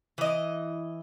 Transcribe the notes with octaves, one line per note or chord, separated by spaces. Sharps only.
E3 D#5